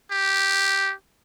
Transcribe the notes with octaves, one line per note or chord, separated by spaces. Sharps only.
G4